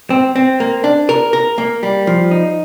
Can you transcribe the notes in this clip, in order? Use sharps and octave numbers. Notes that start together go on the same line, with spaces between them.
C4
C4
A#3
D4
A#4
A#4
A#3
G3
F3
D#4